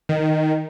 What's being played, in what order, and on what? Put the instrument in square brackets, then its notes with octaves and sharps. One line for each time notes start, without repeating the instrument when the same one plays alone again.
[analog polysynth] D#3